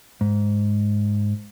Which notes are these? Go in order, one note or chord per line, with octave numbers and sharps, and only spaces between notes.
G#2